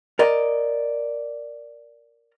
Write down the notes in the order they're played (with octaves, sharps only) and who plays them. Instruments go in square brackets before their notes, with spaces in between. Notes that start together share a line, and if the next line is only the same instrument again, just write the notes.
[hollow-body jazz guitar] A#4 D5 D#5